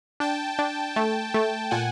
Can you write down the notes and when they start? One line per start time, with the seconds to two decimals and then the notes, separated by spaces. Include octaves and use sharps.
0.20 D4 G5 A5
0.59 D4
0.96 A3
1.34 A3
1.71 A#2 F#5 G#5